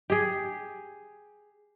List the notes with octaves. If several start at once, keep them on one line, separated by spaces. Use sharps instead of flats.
G4 G#4